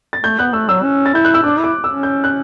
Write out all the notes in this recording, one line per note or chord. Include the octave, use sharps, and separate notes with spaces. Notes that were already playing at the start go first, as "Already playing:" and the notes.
A6
A3 G6
B3 F#6
A3 E6
F#3 E6
C#4
A6
E4 G6
F#6
E6
D4 D6
E4 D6
C#4 E6
G6
F#6